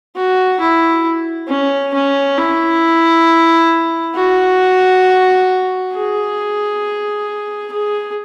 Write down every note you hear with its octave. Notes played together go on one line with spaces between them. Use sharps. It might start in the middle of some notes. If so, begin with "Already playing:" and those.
F#4
E4
C#4
C#4
E4
F#4
G#4
G#4